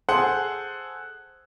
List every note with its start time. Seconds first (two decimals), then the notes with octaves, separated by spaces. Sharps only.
0.09 G#4 A4 C5 F#5